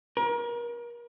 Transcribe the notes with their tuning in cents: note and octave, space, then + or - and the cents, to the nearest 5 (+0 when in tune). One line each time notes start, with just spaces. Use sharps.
A#4 +35